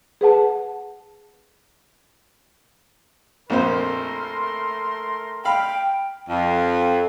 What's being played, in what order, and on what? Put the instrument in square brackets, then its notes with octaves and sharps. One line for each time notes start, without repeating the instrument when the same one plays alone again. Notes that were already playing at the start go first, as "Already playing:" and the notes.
[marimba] G#4 B4 F#5 A5
[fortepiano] A#1 F2 C5 [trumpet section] A3 A#4 C6
[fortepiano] F5 B5 [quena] G5
[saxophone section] F2